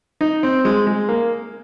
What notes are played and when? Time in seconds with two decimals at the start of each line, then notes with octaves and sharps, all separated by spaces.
0.21 D#4
0.43 C4
0.65 G#3
0.87 G#3
1.09 A#3